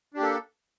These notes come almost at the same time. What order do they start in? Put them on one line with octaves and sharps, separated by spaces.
D4 G4 A#3 A4